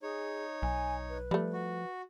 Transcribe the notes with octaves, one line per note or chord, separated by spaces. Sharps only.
D#4 G#4 C#5
B1 G#5
B4
F3 G3 A3
F#4